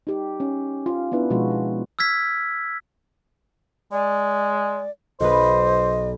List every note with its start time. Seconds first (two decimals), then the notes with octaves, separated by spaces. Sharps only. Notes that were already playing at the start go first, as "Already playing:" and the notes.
0.07 D#4 G4
0.40 C#4
0.86 F4
1.12 B3 D4 E4 B4
1.30 B2 F3 G#3 F#4
1.51 E4
1.99 E6 F6 G#6 B6
3.92 G#3 D5
5.20 B1 B4 C5 D#5